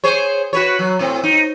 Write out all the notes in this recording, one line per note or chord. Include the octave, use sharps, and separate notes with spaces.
G#4 C5 C#5
F#4 B4 C#5
F#3
A2 C4
D#4